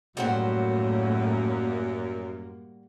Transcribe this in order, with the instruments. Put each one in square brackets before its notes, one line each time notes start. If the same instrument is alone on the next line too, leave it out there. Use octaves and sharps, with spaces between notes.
[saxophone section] F#2 [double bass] A2 [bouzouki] G3 F#4 C5 [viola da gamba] A#3